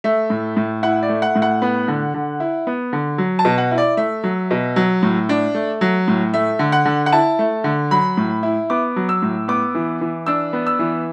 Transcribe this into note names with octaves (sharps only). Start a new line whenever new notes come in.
A3 E5
A2
A2
E4 F#5
D5
A3
F#5
A2
F#5
B3
D3
D3
E4
B3
D3
F#3
A5
B2
F#5
E4
D5
A3 E5
F#3
B2
F#3
A2
D4
A3
F#3
A2
A3 E5
D3
F#5
D3
F#5
E4 A5
A3
D3
F#3 B5
A2
E4
B3 D6
F#3
E6
A2
B3 D6
E3
E3
D4 E6
B3
E6
E3